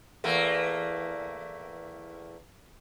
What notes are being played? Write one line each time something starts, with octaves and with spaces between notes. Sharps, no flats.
E2 A3 A#3